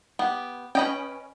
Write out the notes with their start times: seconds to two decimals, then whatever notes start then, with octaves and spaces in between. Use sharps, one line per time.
0.19 B3 G4
0.75 C#4 B4 D#5 G5